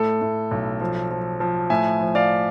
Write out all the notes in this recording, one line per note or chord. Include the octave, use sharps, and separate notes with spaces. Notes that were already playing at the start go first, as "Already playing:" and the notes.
Already playing: A2 A4
A2
B1
F3
F3
F3
A2 E5 G#5
F3
D5 F5